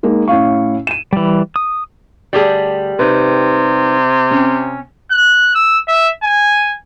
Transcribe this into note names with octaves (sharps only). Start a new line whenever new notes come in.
G#3 A#3 D#4
A2 C#4 E4 F5 C#6
D#7 E7
E3 G3
D#6
D2 G3 G4 G#4 A5
C3 D#4 B4
C4 C#4
F#6
E6
E5
G#5